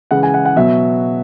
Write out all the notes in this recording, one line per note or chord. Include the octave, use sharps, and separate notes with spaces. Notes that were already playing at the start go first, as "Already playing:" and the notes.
C#3 E3 G#3 F#5
G#5
F#5
F#5
B2 F#3 B3 E5